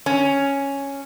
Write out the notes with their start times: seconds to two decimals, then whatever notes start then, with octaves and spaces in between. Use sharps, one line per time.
0.06 C#4